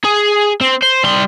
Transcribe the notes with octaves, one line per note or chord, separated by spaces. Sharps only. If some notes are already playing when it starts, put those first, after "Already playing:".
G#4
C4
C5
G3 C6